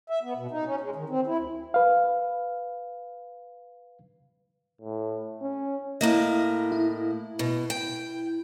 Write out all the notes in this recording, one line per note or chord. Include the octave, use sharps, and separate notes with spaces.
E5
B3
B2
D#4
C#4
G#3
D#3
C4
E4
D2
B4 F5
A2
C#4
A2 A#3 D#5
E4
B2
G5